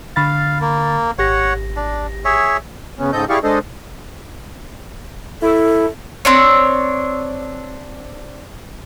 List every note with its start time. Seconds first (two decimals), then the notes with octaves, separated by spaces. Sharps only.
0.16 D3 F5 B5 A6
0.61 A#3
1.19 G#1 G4 C#5 F#5 A#6
1.76 D4
2.25 G#4 C#5 E5
2.99 C#3 B3 C#4
3.12 G#2 C#3 C4 A4 D#5 G6
3.29 E4 G4 G#4 D5 F5 C#6
3.44 G#3 D4 A4 C5 D#5
5.42 E4 A4
6.25 C4 D4 C#5